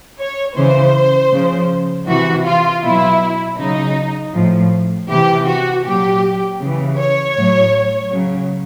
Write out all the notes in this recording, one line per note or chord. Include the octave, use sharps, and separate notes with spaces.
C#5
C#3 E3 C5
C#3 F3
C3 E3 F#4
F4
B2 F#3 E4
C#3 F#3 D#4
A2 F3
C3 E3 G4
F#4
A#2 F#3 G4
C#3 E3
C#5
A2 F#3
C#3 F#3